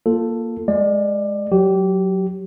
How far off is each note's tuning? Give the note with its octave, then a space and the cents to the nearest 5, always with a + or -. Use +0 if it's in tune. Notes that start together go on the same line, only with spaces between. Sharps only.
A#3 +0 F4 +0 A4 +10
G#3 +5 D5 +25
F#3 +0 G4 -20